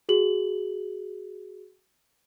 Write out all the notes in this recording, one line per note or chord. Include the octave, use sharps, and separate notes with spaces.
F#4 G#4 F#7